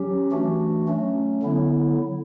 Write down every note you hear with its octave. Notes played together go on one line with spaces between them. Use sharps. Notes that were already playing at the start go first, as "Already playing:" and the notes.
Already playing: F#3 C#4 G4
E3 A3 D4 F#4
F#3 A3 C#4
D3 F#3 B3 E4